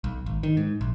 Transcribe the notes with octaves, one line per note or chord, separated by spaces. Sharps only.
B1
G#1
D#3
G#2
A#1